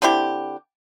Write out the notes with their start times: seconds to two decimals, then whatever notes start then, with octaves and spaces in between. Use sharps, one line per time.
0.02 D3 C4 E4 G4